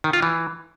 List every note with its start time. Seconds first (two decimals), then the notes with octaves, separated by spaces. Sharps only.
0.04 D#3
0.13 F4
0.22 E3